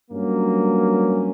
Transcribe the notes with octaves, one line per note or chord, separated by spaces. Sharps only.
G2 F#3 A#3 C#4